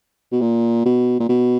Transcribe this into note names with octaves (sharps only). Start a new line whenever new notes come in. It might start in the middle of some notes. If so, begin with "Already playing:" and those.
B2
A#2
B2
A#2
B2